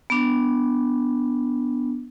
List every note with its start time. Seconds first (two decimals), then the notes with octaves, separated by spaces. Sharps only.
0.10 B3 D4